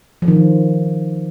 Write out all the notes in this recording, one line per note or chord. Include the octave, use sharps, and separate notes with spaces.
F3
D#3